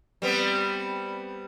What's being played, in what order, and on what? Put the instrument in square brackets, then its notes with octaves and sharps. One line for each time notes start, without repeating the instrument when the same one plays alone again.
[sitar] G3 B3 C4